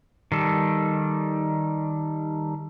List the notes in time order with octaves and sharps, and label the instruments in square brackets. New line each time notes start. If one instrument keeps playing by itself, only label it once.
[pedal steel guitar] D#3 G3 A4